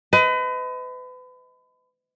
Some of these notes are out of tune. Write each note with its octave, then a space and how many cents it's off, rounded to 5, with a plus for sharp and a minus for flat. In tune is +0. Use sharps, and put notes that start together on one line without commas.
B4 +35 D#5 +25